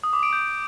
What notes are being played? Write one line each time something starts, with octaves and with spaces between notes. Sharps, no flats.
D#6
D6
D7
G6